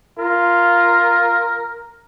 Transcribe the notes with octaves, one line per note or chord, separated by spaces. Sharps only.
F4 A#4